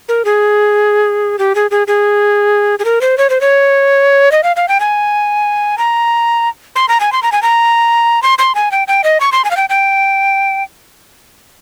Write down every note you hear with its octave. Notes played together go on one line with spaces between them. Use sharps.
A#4
G#4
G4
G#4
G#4
G#4
G#4
A#4
C5
C#5
C5
C#5
D#5
F5
F5
G5
G#5
A#5
C6
A#5
G#5
C6
A#5
G#5
A#5
C6
C6
G#5
G5
G5
D#5
C#6
C6
G#5
F5
G5
G5